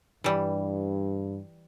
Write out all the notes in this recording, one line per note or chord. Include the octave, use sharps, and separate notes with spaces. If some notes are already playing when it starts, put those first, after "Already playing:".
G2 E3 G3